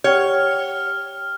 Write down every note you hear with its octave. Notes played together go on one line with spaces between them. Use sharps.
G4 C#5 F#5 G5 F6